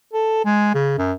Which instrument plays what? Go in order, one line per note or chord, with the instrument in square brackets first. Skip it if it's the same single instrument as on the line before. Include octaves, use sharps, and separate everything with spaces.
[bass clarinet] A4
G#3
C#3
F#2